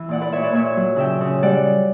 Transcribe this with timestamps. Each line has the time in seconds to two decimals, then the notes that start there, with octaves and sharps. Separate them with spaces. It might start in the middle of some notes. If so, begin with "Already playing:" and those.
Already playing: E3 E5
0.09 A#2 D5 F#5
0.21 B4 D5
0.32 A#2 C#5 E5
0.43 B4 D5
0.53 A#2 C#5 E5
0.76 F#3
0.96 C#3 E5 G5
1.21 C#3
1.43 G3 D5 F#5